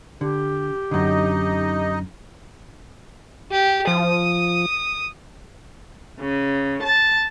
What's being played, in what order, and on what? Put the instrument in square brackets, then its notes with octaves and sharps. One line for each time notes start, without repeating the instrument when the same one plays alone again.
[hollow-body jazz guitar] D3 [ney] G4
[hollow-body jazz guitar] F#2 D3 [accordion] D#4 D#5
[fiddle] G4
[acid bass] F3 [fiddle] D#6
[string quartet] C#3
A5